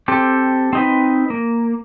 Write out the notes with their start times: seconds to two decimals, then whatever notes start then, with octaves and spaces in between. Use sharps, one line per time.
0.08 C4 G4 A4
0.73 C4 D#4 B4
1.30 A#3